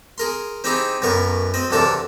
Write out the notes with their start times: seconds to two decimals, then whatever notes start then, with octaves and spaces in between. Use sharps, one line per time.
0.18 G#4 A#4 C6
0.64 C4 D#4 E4 G4 G#4
1.02 B1 F#2 B2 B3 A#4 C#6
1.54 C4 D#5
1.71 B1 E2 C3 D4 A4 A#4